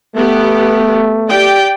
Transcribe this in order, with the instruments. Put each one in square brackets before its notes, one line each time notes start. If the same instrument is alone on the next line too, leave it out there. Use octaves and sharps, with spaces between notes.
[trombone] A3 [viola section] B3 G4
[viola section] G4 D5 G5